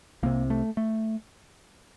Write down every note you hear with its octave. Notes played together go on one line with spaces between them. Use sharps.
C2 C3 A#3
A3
A3